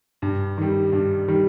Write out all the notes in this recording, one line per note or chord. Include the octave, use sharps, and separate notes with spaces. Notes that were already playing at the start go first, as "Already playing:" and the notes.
G2
D#3 G3
G2
D#3 G3